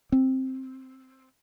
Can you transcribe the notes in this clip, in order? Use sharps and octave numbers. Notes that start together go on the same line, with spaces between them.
C4